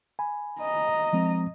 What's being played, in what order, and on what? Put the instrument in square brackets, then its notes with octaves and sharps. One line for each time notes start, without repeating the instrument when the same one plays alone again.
[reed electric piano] G#5 B5
[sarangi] D#5 [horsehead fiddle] A#5
[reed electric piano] F3 G#3 C4